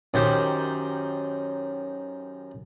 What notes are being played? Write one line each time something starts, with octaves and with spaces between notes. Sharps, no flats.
F#2 D#3 G4 C5